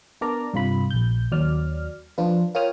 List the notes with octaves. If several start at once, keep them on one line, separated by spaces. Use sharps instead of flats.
B3 D4 A#4 D5 A#5
G2 C3 F4 B5
A#1 G6
D#2 F#3 D5 F6
F3 D4 F4 B4
F4 A#4 C#5 G5 D#6 F6